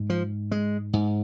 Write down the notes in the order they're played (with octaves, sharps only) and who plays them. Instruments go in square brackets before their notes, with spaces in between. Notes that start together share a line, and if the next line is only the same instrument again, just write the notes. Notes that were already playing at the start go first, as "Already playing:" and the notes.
Already playing: [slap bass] G#2
F3
G#3
G#2